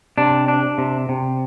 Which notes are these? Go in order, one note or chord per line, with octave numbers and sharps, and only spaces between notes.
C3 D4
D4
C3
C3